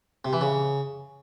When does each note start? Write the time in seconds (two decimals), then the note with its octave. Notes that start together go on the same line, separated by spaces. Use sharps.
0.25 C3
0.33 E3
0.41 C#3